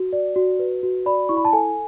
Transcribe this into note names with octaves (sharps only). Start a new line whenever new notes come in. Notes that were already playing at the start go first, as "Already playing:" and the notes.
Already playing: F#4
D5
F#4
B4
F#4
D5 B5
E4 C#6
B5
A5
A4 G#5